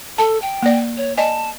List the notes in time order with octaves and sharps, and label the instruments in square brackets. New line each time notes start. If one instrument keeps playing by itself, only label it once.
[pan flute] A4 [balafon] A5
[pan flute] G5
[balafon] A#3 D5
[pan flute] C#5
[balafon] D5 D#5 G#5 [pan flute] A5